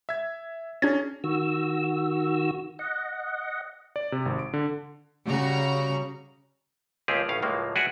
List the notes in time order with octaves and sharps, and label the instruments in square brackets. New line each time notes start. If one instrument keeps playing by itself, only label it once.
[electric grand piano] E5 G#6
[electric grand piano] C#4 G#4 [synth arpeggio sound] D4 G#6
[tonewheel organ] D#3 F#4 E6
D#5 F#5
[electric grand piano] D5
C3
G#1
D7
D3
[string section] C#3 G3 F#4 A#5
[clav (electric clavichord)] C#2 F3 A#3 C4 G4 G#4
A1 A2 C#4 F5
C#2 A2 F3 F#3 G#3 A#3
F#4 G#4 B4 D5 E5 F#5